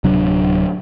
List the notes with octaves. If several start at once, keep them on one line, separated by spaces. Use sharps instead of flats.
D1 C3 F#3 D4